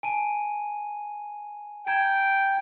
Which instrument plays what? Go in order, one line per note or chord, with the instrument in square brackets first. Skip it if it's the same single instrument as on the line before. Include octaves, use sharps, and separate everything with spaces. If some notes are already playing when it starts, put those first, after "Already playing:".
[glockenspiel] G#5 A5 D#7
[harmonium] G5 [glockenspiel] A#5 G#6 D7